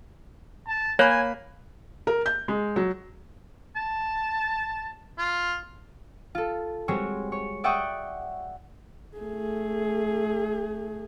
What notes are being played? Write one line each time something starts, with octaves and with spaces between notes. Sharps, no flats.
A5
A#3 C#5 G#5 B5 F#6
A#4
G6
G#3
F#3
A5
F4
F4 A4
G3 G#3 C4 F#4 C5 C#5
C#5
D5 E5 F#5 G5 C#6 D#6
A3 G#4